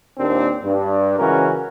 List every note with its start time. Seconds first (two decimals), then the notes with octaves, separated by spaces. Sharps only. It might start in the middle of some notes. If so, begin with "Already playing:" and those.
0.18 D#2 A#2 C4 D4
0.63 G2
1.18 C#2 E3 C#4 F#4 A#4